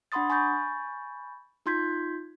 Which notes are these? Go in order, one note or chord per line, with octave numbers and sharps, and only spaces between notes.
D4 F#5 B5 C6 D#6 A6
G#5 B5 C#6 G6 A6
D#4 F4 C6 G6 G#6 B6